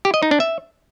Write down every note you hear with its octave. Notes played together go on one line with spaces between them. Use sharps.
G4
D#5
D#4
D4
E5